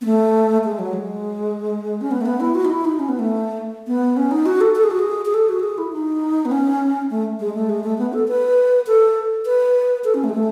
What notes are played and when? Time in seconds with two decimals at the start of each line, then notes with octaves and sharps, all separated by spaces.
0.01 B3
0.05 A3
0.64 G#3
0.79 F#3
0.93 G#3
2.01 C#4
2.11 B3
2.21 A3
2.26 B3
2.40 E4
2.55 F#4
2.65 D#4
2.70 E4
2.85 D#4
2.99 C#4
3.09 B3
3.19 A3
3.87 B3
4.17 C#4
4.31 D#4
4.46 F#4
4.61 A4
4.75 A4
4.84 G#4
4.91 F#4
4.99 G#4
5.25 G#4
5.34 A4
5.49 F#4
5.59 A4
5.63 G#4
5.78 E4
5.93 D#4
6.45 B3
6.51 C#4
7.10 A3
7.40 G#3
7.54 A3
7.69 G#3
7.84 A3
7.98 B3
8.13 A4
8.28 B4
8.87 A4
9.46 B4
10.04 A4
10.14 C#4
10.24 A3
10.29 G#3
10.34 A3